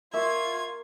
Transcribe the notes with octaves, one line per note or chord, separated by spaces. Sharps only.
A#3 F4 E5 C#6 G#6